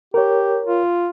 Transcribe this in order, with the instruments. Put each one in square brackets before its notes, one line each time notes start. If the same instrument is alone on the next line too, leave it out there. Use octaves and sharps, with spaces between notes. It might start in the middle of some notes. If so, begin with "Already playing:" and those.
[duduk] G4 [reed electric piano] A#4 C#5
[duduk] F4